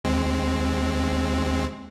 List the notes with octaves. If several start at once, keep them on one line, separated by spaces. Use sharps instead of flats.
D#2 G#3 C4